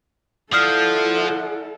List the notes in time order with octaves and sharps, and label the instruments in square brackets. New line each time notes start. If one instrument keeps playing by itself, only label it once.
[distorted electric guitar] F3 [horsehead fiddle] E4 A4 [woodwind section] D5 F#5 [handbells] D#6 F6 C7